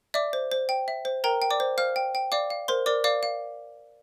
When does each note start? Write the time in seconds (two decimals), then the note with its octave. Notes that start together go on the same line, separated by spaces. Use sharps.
0.14 D5 E5 D6
0.33 C5
0.52 C5
0.69 G5
0.88 E5
1.05 C5
1.24 A#4 G5 A#5
1.42 G5
1.51 D5 D6
1.60 C5
1.78 C5 F5 F6
1.96 G5
2.15 G5
2.32 D5 F5 D6
2.50 F5
2.68 A#4 C5 C6
2.86 A#4 D5 D6
3.04 D5 F5 D6
3.23 F5